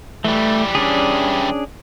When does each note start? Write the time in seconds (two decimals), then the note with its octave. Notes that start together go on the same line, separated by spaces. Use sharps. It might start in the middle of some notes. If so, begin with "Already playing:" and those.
0.25 E3 G3 A3
0.75 C#4 D4 G#4